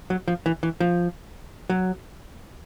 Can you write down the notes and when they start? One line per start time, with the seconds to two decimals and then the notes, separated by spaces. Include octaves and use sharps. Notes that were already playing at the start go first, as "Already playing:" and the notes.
0.10 F#3
0.28 F3
0.46 E3
0.63 E3
0.80 F3
1.70 F#3